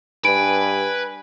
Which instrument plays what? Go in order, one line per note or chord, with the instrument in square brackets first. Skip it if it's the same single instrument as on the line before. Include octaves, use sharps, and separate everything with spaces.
[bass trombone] G2 [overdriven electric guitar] B4 [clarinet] G#5 [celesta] D7